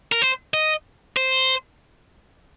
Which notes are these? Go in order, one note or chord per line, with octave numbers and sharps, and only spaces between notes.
A#4
C5
D#5
C5